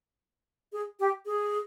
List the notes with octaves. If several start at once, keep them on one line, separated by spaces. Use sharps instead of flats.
G#4
G4
G#4